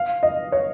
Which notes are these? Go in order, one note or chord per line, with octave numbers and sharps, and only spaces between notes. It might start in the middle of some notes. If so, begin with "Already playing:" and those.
Already playing: F5
D#5
C#5